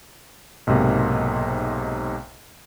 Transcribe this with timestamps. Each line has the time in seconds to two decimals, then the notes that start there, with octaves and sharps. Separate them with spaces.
0.67 B1 G#2 C3 A#3